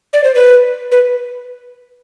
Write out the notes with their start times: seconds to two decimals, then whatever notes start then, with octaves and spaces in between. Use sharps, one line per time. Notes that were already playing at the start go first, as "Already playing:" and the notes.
0.13 D5
0.24 C5
0.35 B4
0.92 B4